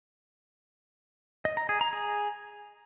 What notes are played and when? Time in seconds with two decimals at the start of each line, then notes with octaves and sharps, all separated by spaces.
1.45 D#5
1.57 A#5
1.69 G#4
1.81 A#5
1.93 G#4